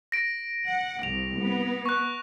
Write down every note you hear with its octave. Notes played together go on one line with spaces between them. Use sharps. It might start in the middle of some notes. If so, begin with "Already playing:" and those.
A#6 D7
F#5
C2 F7
B3
C#6 F#6